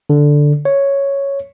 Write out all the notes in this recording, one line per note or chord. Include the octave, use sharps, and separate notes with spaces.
D3
C#5